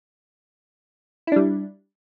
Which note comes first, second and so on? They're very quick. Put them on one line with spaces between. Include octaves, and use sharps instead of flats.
E4 D4 G3